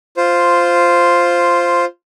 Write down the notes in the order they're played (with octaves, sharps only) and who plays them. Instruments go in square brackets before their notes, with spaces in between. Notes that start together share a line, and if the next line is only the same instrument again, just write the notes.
[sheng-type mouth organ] F4 C5